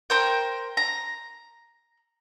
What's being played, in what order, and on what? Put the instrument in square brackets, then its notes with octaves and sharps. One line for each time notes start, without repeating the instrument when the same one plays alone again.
[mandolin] A#4 C5 G5
A#5